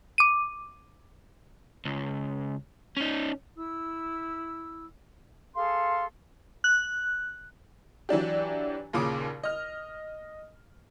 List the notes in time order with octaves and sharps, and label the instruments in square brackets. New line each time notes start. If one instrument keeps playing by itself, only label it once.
[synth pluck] D6 D#7
[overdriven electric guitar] C#2
C#4 D#4
[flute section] E4 E6
G#4 A4 F5 C6
[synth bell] F#6
[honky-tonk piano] E3 F#3 D4 G4
D#2 A#2 C#3 D6
D#5 F6